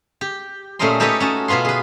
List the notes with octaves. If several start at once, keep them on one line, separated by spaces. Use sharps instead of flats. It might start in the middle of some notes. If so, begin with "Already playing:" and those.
G4
A#2 A3 C#4 A#4 D#5 C6
D#4 G4 A4 B4 C#5 D#5
C#4 F#4 A5
B2 B3 F4 B4 C6
G#4 B4